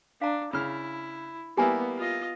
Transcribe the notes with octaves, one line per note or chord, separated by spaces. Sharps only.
D4 F5 A#5
C#3 E4 F6
G3 A#3 B3 E4 G4 G#5
F4 D#5